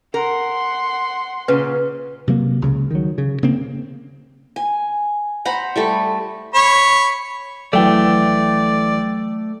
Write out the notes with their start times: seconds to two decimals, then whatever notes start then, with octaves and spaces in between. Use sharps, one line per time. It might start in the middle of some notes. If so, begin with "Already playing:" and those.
0.14 A#4 F#5 C6
1.48 A#2 C#3 B4
2.27 C3 F#3 A#3
2.62 C#2 C#3
2.91 D#3 F#3
3.18 C#3
3.43 C#3 A#3 C4
4.56 G#5
5.45 C5 F#5 A#5 B5
5.76 G3 A3 A4
6.55 C#5 B5
7.73 G#1 E3 F#3 A3 D5 G5